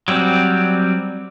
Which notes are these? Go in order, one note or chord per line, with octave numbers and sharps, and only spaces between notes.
F#3 G3 C4